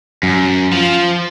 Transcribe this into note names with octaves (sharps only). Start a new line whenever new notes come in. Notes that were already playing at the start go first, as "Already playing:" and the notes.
F#2
F3